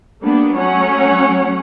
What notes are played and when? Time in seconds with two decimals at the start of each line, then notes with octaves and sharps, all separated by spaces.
0.24 G3 A#3 B3 D4
0.54 F#3 A3 C#4 C#5 F#5